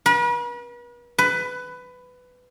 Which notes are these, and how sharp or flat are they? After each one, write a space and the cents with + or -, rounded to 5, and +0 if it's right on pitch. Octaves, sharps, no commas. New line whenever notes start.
B4 -40
B4 +15